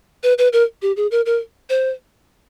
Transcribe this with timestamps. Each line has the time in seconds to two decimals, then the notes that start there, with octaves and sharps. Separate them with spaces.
0.23 B4
0.38 B4
0.53 A#4
0.82 G4
0.97 G#4
1.11 A#4
1.26 A#4
1.70 C5